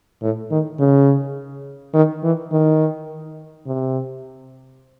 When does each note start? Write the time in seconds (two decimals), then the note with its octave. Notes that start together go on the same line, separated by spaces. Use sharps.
0.22 A2
0.51 D#3
0.79 C#3
1.94 D#3
2.23 E3
2.51 D#3
3.66 C3